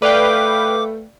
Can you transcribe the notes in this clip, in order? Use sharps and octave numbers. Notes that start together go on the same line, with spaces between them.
A3 B4 D5 F5 G5 D6